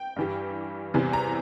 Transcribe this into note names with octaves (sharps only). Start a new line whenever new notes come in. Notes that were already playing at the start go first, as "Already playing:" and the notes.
Already playing: G5
G2 E3 G3
E2 C3 E3 G3
A#5